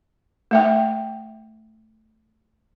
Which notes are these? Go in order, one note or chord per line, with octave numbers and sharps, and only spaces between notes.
A3 E5 G5